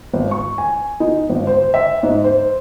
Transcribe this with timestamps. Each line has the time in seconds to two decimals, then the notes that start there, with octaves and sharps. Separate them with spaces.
0.13 G#1
0.31 C#6
0.58 G#5
1.00 D#4
1.30 G#1
1.47 C5
1.74 E5
2.03 G#2
2.24 C5